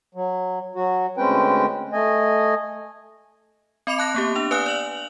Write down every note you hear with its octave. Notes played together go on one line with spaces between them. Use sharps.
F#3
F#3 F#4
D2 G#3 C4 C#4 B4 G5
A3 D#5 G#5
C4 D#5 B5 D6 C#7 F7
A5 F#6 A#6
A#3 B3 G4
D4 F7
B4 D5 F5 G#5 D#6 F#6
D5 F7 F#7